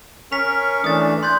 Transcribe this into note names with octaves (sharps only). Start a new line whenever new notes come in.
C#4 A#4 C#6 B6 F7
E3 A3 D4 D#6 A6
C6 F#6 G6 A6